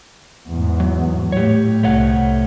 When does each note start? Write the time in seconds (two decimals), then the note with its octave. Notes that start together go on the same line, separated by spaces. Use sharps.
0.49 E2 G#2
0.80 F#3
1.32 A2 G4 C#5
1.83 C2 A3 C#5 F#5